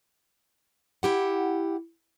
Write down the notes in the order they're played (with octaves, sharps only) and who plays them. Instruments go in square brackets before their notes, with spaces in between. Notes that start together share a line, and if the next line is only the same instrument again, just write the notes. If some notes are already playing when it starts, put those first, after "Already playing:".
[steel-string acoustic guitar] E4 G4 F#5